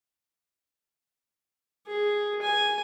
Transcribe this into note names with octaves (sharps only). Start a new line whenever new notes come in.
G#4
G#5